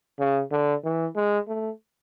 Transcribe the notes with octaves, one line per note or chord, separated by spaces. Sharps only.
C#3
D3
E3
G#3
A3